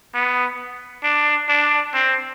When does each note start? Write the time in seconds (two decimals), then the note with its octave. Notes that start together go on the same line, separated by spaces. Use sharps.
0.14 B3
1.03 D4
1.49 D4
1.94 C4